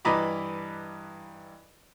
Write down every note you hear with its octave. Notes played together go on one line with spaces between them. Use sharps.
G2 E3 D#5 A#5 B5 D6